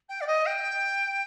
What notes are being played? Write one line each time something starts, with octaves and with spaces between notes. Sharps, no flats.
G5
D5
D#5
G5